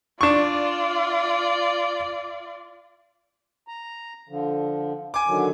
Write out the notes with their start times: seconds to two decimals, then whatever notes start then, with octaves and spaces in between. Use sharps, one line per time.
0.21 D4 F4 D5 C#6
3.68 A#5
4.29 D3 F3
5.14 G#5 D6
5.28 D3 D#3 F#3